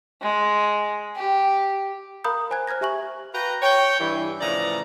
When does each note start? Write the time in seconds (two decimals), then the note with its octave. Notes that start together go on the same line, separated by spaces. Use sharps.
0.22 G#3
1.16 G4
2.24 A#4 F5 A#5 B5 D#6 G6
2.51 C5 G#5 A#5 F#6 G#6
2.67 C5 F6 F#6 G#6 A#6
2.81 G4 E5 G#5 C#6 F#7
3.34 F#4 B4 F5 G5 A#5
3.62 C#5 G5
4.00 G2 E3
4.41 A2 C#3 E3 F3 D5 A#5